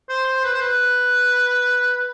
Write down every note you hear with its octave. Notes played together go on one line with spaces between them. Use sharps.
C5
C5
B4
C5
B4